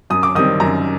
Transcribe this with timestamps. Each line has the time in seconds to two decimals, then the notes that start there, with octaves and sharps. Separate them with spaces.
0.10 F#2 D#6
0.23 D6
0.35 D#3 G3 C4 D#6
0.60 F#2 A#5